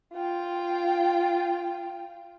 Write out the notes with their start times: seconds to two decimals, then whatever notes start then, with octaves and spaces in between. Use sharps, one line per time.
0.13 F4 G5